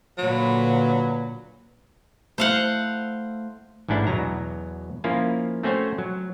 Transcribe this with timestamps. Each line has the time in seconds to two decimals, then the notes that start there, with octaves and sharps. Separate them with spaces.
0.18 A#2 D3 F#3 B4
2.38 A3 E4 C5 F5 F#5
3.88 A1 G#2 C#4 D4 E4 F#5
4.07 E2 B2 F#3 A#5
5.04 F3 A#3 C#4 E4 F4
5.63 A3 C4 C#4 F#4 C5 C#5
5.98 F#3